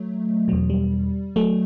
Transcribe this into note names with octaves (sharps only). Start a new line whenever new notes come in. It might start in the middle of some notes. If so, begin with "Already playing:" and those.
Already playing: F#3 A3
E2 B2 F#3
G3
F#3 A3